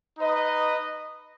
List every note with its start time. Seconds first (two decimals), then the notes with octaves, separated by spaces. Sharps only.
0.18 D#4 B4 D#5